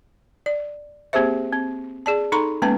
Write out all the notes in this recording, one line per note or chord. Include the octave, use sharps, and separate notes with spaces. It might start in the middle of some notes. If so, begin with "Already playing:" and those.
D5
A#3 C4 G4 G#4 C5 E5
C4
G#4 D5 A5
D#4 A4 A#5 B5 C#6
G#3 A#3 B3 C#4 B4 A5